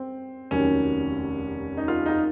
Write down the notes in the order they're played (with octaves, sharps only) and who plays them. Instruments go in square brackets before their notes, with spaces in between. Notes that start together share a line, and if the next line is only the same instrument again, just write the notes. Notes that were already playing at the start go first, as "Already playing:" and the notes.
Already playing: [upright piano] C4
F1 D#2 D#3 F#3 C#4
D#4
F4
D#4
F4